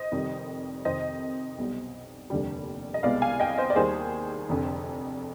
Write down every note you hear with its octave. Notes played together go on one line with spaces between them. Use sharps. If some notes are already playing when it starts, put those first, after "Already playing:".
Already playing: C5 D#5
F1 F2 D#3 G3
F2 C3 D#3 C5 D#5
B1 B2 G3
F1 D#2 D3 G3
D#5
C2 B2 G#3 B3 D5 F5
F5 G#5
D#5 G5
C5 D#5
D5
D#2 D#3 G3 G#4 C5
F1 F2 D3